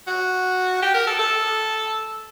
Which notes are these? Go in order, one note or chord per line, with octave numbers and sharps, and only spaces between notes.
F#4
G4
A#4
A4
A4